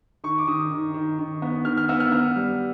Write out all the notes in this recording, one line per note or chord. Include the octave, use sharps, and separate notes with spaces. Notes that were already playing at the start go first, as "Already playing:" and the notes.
D#3 C#6
D6
D#3 D#6
D#3
D#3
D#3
B3
D#3 F6
F6
B3 E6
F6
B3 F6
G3